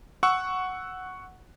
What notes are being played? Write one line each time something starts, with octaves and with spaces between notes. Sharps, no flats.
F#5 C#6 E6